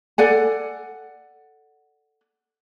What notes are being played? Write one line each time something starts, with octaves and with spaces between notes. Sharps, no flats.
A4 D5 F#5 G#5